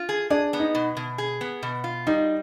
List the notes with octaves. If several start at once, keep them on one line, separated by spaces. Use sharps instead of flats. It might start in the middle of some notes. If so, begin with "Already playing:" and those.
Already playing: F4
G#4
D4 G#4
B3
D#4
B2
B2
G#4
B3
B2
F4
G3 D#4